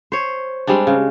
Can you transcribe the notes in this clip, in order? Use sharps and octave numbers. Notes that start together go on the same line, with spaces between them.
C5 C#5
G3 G#3 C4 D4
C#3